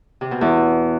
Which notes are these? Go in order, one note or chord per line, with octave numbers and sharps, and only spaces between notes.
C3
B2
E2